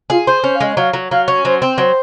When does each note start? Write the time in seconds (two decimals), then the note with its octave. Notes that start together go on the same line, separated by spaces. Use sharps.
0.10 F4 G#4
0.27 C5
0.44 C#4
0.55 F5
0.60 G#3
0.77 F#3 F5
0.93 F#3
1.11 F#3 F5
1.28 C#4
1.45 F#3 C5
1.62 C4
1.78 F#3 C5